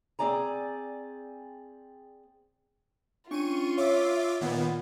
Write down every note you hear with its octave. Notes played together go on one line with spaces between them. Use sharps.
C4 G#4 D5 G#5 A#5
C#4 D4 F4 C#6 D#7
C#5 E5 F5 C#6 D6
A#2 D#3 B3 D5